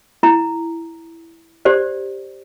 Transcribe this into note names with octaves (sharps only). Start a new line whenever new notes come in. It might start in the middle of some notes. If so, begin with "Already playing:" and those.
E4 A#5
G4 C5 D5